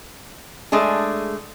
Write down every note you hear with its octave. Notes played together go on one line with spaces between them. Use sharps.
G#3 A3 D4 G#4